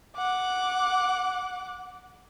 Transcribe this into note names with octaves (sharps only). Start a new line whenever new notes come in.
F#5 D6